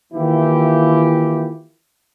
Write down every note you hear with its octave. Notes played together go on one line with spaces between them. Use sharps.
D#3 E3 A#3 E4 F4 G4